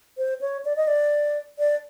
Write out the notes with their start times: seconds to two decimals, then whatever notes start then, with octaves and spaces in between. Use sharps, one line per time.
0.18 C5
0.41 C#5
0.65 D5
0.76 D#5
0.87 D5
1.59 D5